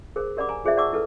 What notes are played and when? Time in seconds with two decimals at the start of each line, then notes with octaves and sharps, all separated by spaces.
0.16 G#4 A#4 C5
0.37 G4 A#4 D5 F#5 B5 D6
0.49 G#5 A#5
0.65 F4 G#4 C5 D5 E5
0.77 D5 F#5 A5 C#6 D6 E6
0.93 E4 A4 B4